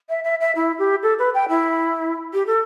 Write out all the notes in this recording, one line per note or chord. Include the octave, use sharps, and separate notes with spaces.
E5
E5
E5
E4
G4
A4
B4
G5
E4
G4
A4